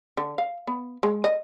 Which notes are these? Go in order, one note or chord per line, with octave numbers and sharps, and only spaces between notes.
D3
F5
B3
G#3
D#5